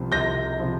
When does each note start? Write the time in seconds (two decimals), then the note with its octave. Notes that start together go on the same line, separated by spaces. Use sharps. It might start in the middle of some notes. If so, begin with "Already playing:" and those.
Already playing: C2 C3 F3
0.12 C2 G6 A#6
0.59 C3 F3